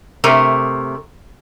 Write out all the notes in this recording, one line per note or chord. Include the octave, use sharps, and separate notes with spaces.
C3 A3 A#4